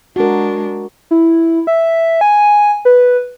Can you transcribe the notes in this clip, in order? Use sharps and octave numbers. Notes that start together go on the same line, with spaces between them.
G#3 D4 F#4 A#4
E4
E5
G#5
B4